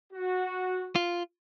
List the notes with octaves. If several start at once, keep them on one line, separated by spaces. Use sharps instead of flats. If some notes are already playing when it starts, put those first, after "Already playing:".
F#4
F4